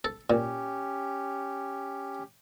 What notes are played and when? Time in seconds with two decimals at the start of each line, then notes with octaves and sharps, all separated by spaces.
0.05 A4
0.30 A#2 C#4 G4